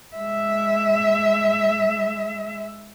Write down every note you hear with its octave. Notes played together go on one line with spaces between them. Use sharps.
G#3 E5